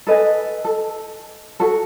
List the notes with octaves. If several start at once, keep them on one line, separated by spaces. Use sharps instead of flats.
A4 B4 D#5 G#5
A4
F#4 A4